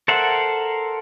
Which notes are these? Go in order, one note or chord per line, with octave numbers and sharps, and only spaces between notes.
A4 A#4 C5 E5 F#5